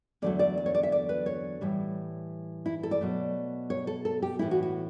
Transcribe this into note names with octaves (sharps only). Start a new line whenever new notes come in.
E2 D3 F#3 A3 D5
D5
D5
C#5
D5
E5
D5
B4
C#5
A2 E3 G3
E4
A4
D5
B2 F#3 A3
C#5
A4
A4
G4
A2 E3 A3 E4
F#4
F#4